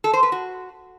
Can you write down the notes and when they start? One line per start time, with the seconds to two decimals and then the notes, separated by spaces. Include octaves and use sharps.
0.04 A4
0.13 C5
0.23 B4
0.32 F#4